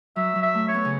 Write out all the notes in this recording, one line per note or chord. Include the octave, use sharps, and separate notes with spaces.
F#3 E5
F#3
E5
A3
C#5
B3
C#3